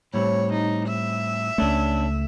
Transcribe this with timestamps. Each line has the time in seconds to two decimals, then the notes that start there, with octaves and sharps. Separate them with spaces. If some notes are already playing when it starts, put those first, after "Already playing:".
0.14 A2 G3 C4 C#5
0.53 D#4
0.88 E5
1.58 C#2 A3 C#4 D4